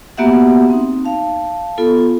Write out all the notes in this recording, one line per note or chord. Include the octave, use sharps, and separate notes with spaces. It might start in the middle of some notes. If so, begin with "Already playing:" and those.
A#3 B3 F#4 G4 E5 F#5
C4 D#4
F5 A5
B3 F4 A4